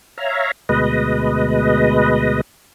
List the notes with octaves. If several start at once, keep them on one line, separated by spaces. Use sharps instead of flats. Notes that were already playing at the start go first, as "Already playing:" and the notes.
C#5 E5 F5 A#5
D2 B2 G#3 B4 D#5